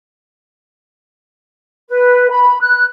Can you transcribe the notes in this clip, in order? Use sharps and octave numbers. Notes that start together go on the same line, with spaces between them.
B4
B5
F#6